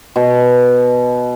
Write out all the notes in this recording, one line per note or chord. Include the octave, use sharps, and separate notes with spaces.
B2